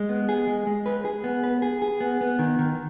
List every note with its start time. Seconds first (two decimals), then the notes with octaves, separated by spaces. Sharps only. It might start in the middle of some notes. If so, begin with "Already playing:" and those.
Already playing: G#3
0.09 B3
0.29 G#4
0.47 G#3
0.67 G#3
0.86 B4
1.05 G#4
1.24 B3
1.44 B4
1.62 G#4
1.82 G#4
2.00 B3
2.21 B3
2.39 D#3
2.59 D#3